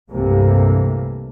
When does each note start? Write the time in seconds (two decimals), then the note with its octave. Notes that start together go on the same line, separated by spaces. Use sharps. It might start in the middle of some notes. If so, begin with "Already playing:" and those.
0.11 C2 G2 C3 E3 A3 A#3